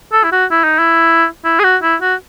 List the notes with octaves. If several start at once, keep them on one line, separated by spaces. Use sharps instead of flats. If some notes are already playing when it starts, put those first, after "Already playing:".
A4
E4
F#4
E4
D#4
E4
E4
G#4
F#4
E4
F#4